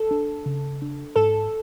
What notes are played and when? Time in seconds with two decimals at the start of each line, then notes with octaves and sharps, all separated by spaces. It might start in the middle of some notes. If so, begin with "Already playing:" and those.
Already playing: A4
0.11 D4
0.46 C#3
0.82 D4
1.16 G#2 A4